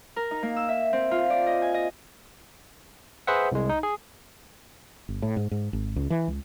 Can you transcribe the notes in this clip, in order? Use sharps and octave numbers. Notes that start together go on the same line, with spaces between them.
A#4
D#4
A#3
E6
E5
C4
F4
D5
D#5
G#5
D#5
G#4 B4 C5 E5 F#5
C2 G#3
D#4
G#4
G1
A2
G#2
G#2
G#1
C#2
E3
C#2